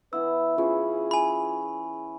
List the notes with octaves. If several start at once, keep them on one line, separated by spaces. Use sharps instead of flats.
E3 B3 E4 B4 E6
C#4 F4 G#4 C5
G#5 B5